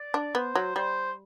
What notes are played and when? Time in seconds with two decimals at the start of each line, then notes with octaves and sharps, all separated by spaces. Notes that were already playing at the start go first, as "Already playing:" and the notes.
Already playing: D5
0.14 D4
0.35 B3 C5
0.55 F#3
0.76 G3 C5